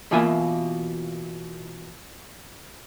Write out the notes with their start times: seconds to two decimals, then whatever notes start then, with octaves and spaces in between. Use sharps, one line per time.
0.11 B2 E3 A#3 F4 E5 G#5